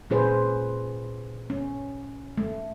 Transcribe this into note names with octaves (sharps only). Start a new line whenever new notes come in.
A#2 C#4 G#4 B4 C5
C#4
A3